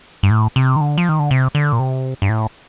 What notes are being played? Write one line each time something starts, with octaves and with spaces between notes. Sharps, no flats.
G2
A2
C3
D#3
D3
F3
D#3
D3
C3
D3
A#2
C3
G2
A2